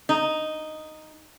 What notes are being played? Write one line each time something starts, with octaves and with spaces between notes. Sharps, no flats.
D#4